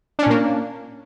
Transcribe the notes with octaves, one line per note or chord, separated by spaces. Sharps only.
A#2 A#3 C#4 D4